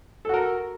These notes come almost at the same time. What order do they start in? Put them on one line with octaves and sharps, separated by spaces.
A4 F#4 A#4